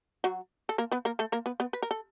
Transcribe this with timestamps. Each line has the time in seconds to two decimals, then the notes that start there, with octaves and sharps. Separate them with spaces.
0.24 F#3 F#4
0.69 A4
0.78 A#3 A#4
0.92 B3 B4
1.05 A#3 A#4
1.19 A3 A4
1.32 A#3 A#4
1.46 B3 B4
1.60 B3 B4
1.73 B4
1.82 A#4
1.91 A4